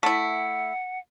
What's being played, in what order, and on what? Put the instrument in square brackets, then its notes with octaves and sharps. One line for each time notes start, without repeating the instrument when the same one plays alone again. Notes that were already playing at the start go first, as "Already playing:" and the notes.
[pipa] A3 E4 [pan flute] F#5